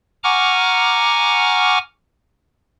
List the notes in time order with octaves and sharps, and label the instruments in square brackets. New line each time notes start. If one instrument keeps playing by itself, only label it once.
[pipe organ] F#5 G#5 A#5 C#6 D6 F6